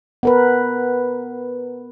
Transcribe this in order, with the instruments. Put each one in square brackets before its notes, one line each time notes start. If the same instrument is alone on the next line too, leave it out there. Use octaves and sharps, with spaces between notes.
[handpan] B3 A#4 B4